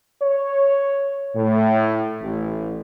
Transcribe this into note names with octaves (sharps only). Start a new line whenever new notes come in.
C#5
A2
A1